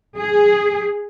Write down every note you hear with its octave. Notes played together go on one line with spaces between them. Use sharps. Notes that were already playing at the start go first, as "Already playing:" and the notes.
G#4